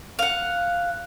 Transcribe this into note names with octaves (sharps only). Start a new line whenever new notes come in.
F5 F#5